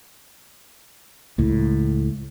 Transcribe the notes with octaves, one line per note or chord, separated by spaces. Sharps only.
C#2 A2